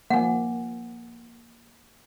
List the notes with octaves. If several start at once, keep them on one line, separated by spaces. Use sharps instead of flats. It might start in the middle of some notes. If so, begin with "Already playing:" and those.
F3 A#3 F#5 G#5